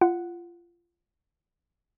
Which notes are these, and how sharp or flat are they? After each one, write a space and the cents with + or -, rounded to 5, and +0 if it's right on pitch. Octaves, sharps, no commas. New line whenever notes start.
F4 -20 F#5 +0